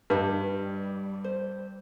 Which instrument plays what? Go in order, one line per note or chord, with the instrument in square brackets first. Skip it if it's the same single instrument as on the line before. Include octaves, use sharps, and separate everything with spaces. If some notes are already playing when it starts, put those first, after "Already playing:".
[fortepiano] G2 [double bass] G3 [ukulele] G4 B4 D#5
[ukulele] C5